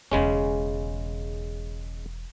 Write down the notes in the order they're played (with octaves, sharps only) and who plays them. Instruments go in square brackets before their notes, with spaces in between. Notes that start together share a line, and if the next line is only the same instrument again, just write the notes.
[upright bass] E1 E2 [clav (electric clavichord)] C#3 G#3 C#4